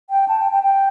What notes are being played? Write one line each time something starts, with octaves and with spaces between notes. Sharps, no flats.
G5
A5
G5
G5
G5